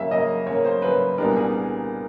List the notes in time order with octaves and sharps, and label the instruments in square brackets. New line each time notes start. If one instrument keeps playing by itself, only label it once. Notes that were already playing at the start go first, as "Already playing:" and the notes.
Already playing: [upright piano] C#3 F#3 A#3 E5 F5
C#3 F#3 A#3 D#5
C#3 F#3 A#3 C#5
C5
C#3 F#3 A#3 B4
C2 A#2 G3 B3 D4 A#4
G#4